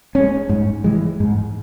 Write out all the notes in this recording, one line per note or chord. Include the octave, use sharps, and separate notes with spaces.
G#3 C#4
G#2
E3 G#3
G#2